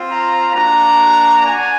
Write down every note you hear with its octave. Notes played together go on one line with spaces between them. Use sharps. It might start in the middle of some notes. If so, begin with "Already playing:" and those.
Already playing: C4 F4
A#5
A#3 D4 F#4 A#5
D4 F#4 G#5